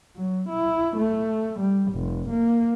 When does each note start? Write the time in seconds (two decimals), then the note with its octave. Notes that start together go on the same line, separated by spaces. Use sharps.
0.16 F#3
0.50 E4
0.98 A3
1.60 G3
1.93 F1
2.30 A#3